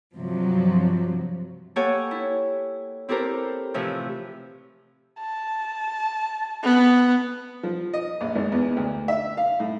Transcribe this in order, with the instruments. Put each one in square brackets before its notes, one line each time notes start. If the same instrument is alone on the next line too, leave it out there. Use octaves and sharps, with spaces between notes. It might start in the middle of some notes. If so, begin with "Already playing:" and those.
[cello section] G2 C3 F3 F#3
[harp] A#3 G4 A4 C#5 F#5 G#5
E4
C4 E4 G4 A4 A#4 C5
A2 C3 E3 F3
[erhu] A5
[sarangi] B3
[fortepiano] F3
D#5
A#1
G#1
E2
D2
E5
F5
A2